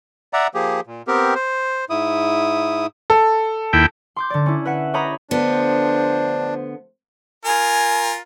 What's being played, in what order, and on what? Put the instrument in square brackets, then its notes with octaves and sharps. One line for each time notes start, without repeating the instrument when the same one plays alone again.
[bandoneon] D5 E5 F#5 A#5
F3 A#3 G4 G#4
A#2
B3 C4 G4 A#4
C5
G#2 E4 D#6
[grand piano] A4
[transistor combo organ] D#2 E4 G5
[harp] C6 D6 G6
D3 D5
C#4 E4
B4 E5 F#5
G4 C#5 D#5 A#5 B5
[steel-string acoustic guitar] D3 B3 [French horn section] F3 A3 C5 [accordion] D4
[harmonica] F4 A#4 [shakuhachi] G#5